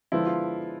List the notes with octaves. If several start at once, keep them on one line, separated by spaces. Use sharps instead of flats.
D3 F3 G#3 B3 E4
F4